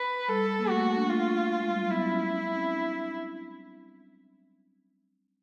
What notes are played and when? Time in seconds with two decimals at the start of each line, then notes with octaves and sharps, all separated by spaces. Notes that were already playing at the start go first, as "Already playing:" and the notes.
Already playing: B4
0.28 G3 A4
0.59 A#3
0.69 A3 F#4
0.82 A#3
0.96 D4
1.10 A3 F4
1.60 G#3
1.70 G3
1.81 F#3
1.90 B3 E4
2.11 C#4
2.31 C#4
2.52 C4
2.71 D4